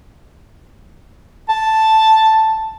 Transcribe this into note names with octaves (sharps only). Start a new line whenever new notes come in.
A5